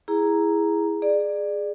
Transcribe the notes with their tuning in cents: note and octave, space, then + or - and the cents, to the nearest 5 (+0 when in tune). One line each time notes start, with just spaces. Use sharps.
E4 +0 G#4 -5 A#5 +0
G#4 +0 D5 +20